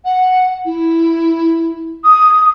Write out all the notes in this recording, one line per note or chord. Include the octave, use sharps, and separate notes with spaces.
F#5
E4
D#6